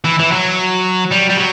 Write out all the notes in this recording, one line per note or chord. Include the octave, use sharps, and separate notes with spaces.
E3
E3
F#3
G3
G3
F#3